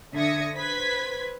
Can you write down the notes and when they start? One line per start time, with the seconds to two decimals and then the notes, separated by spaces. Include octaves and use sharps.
0.14 D3 E5 D#6 G#6 A#6 C#7
0.57 B4 C5 G#6 B6